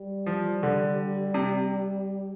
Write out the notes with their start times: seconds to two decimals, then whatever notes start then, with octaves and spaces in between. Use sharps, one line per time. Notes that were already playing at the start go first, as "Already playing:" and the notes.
Already playing: G3
0.26 F3
0.63 D3
1.34 C3